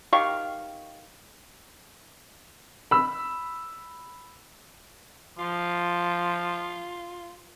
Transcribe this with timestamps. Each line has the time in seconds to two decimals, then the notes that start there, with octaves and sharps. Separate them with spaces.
0.13 D#3 G4 F5 C#6
2.91 B5 E6
5.38 F3 F4